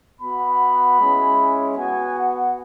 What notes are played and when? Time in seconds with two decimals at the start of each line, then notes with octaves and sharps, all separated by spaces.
0.21 B3 F#4 B5
0.99 G#3 C#4 E4
1.76 B3 F#4 G#5
2.17 F#5